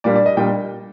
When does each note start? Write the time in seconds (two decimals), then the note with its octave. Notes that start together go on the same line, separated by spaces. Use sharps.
0.04 A#2 G3 A#3 D4 D5
0.16 D5
0.26 D#5
0.37 A#2 G3 A#3 D4 G5